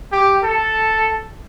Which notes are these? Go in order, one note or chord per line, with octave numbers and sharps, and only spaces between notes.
G4
A4